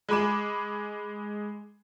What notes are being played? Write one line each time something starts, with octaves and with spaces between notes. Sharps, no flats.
G#3 G#4 B5 D6 E7